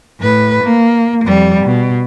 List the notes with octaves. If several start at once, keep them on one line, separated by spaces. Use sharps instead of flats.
A2 B4
A#3
F2 G3
B2